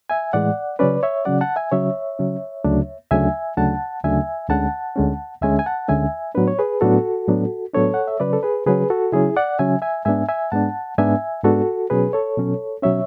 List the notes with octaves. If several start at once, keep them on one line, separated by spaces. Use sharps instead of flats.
E5 G#5
A2 E3 G#3 D5 F#5
C#3 F#3 C#4 B4 D5
C#5 E5
C#3 F#3 C#4 D5 F#5
F#5 A5
E5 G#5
C#3 F#3 C#4 C#5 E5
C#3 F#3 C#4
D2 C#3 F#3 A3 D4
D2 C#3 F#3 A3 D4 E5 G#5
D2 C#3 F#3 A3 D4 F#5 A5
D2 C#3 F#3 A3 D4 E5 G#5
D2 D3 G#3 C#4 F#5 A5
D2 D3 G#3 C#4
D2 D3 G#3 C#4 E5 G#5
G#5
F#5 A5
D2 D3 G#3 C#4 E5 G#5
A2 F#3 B3 D4 B4
C#5
G#4 B4
A2 F#3 B3 D4 F#4 A4
A2 F#3 B3 D4
A2 F#3 B3 D4 A4 C#5
F#5
E5
C#3 F#3 C#4 B4 D5
A4
G#4 B4
C#3 F#3 C#4 G#4 B4
F#4 A4
C#3 F#3 C#4 E4 G#4
D5 F#5
C#3 F#3 C#4 E5 G#5
E5 G#5
G#2 G#3 B3 D4 E5 G#5
E5 G#5
G#2 G#3 B3 D4 F#5 A5
G#2 G#3 B3 D4 E5 G#5
G#2 G#3 B3 D4 F#4 A4
B2 F#3 C#4 G#4 B4
A4 C#5
B2 F#3 C#4
B2 F#3 C#4 C#5 E5